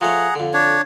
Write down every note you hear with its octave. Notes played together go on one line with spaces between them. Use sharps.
F3 A3 G#4 C#5 F#5 A#5
F2 D3
D4 C#5